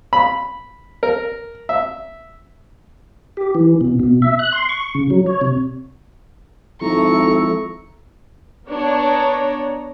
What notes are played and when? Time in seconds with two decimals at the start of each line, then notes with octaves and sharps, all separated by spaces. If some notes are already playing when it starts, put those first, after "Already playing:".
0.13 B5
1.03 A#4
1.69 E5
3.37 G4
3.55 E3
3.81 B2
3.99 B2
4.22 E5
4.39 F#6
4.52 C6
4.69 C#6
4.95 C#3
5.10 F#3
5.26 C#5
5.41 C3
6.81 G#1 F3 E4 A4 A#5 C#6
8.68 B3 D4 C#5 A#5